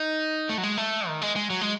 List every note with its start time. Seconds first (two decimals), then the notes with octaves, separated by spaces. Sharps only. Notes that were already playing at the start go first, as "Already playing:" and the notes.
Already playing: D#4
0.49 A3
0.58 F#3
0.63 G#3
0.78 A3
1.07 D#3
1.22 G#3
1.36 G#3
1.50 F#3
1.61 G#3